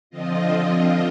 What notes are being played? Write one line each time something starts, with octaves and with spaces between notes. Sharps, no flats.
D3 F3 C4 F4 D#5